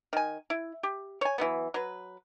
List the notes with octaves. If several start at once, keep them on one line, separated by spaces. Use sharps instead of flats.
D#3 G#5
E4
G4
C#5 G#5
E3 F#3 B3
F#3 B4